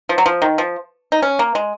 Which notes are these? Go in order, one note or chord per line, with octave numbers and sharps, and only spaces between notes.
F3
F#3
F3
D#3
F3
D#4
C#4
A#3
G#3